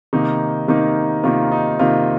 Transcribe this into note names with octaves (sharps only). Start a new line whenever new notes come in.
C3 D#3 A#3 D#4
C3 D#3 A#3 D#4
C3 D#3 A#3 F4
D#4
C3 D#3 A#3 F4